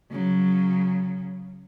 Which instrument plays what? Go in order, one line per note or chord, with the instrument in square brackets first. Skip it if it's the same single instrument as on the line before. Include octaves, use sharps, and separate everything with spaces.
[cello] C#3 F#3